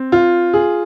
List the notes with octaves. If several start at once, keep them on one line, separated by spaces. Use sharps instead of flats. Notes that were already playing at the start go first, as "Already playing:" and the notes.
Already playing: C4
F4
G#4